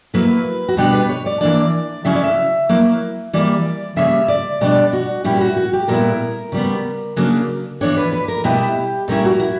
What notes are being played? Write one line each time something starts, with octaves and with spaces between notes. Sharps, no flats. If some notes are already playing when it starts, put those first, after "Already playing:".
F#3 A#3 E4 B4
F#4
B2 G3 B3 D4 G4
B4
C#5
D5
E3 A#3 D4 D5
C#3 F#3 C#4 E4 E5
D5
E5
F#3 A#3 E4
E3 G3 A#3 D5
C#3 G3 A#3 C#4 E5
D5
B2 G3 B3 D4 D5
F#4
A#2 G3 C#4 E4 G4
F#4
F#4
G4
A#2 G3 B3 E4 A#4
C#3 G3 B3
C#3 F#3 A#3 D4
E3 B3 D4 C#5
B4
B4
A#4
B2 G3 B3 E4 G4
A#2 G3 C#4 E4 A#4
F#4
E4